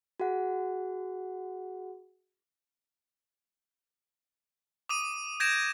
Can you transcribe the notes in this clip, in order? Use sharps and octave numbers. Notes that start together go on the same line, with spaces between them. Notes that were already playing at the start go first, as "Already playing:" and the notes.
F#4 G#4 F#5
D6 D#6 D#7
G6 G#6 A#6 D7 E7